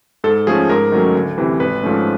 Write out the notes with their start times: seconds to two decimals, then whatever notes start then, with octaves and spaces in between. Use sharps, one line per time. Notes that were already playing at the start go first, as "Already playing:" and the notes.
0.24 G#2 A4
0.47 F3 A3 C#4 G#4
0.69 G#2 A#4
0.92 D#3 F#3 A3 C#4
1.15 D2
1.38 C3 E3
1.60 G#1 B4
1.83 G#2 F3 A3 C#4